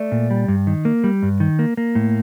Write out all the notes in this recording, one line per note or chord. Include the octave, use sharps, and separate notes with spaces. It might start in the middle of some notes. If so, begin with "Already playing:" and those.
Already playing: A3 D5
A#2
G3
G2
D#3
A#3
G3
G2
D#3
A#3
A#3
A2